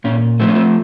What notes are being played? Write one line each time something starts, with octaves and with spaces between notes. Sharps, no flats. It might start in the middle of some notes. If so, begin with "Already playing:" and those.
A#2 C#4
F3 A3 C4
C#4
C4